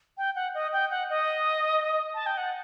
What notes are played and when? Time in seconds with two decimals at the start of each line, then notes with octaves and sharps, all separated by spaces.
0.18 G5
0.36 F#5
0.55 D#5
0.73 G5
0.91 F#5
1.10 D#5
2.14 A5
2.26 G5
2.37 F#5